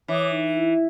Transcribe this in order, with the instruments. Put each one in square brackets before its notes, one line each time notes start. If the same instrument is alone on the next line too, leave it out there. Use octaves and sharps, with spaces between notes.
[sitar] E3 [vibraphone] C#5 D6 D#6
[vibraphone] D#4
E4